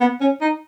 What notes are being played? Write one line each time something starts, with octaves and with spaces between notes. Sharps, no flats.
B3
C#4
D#4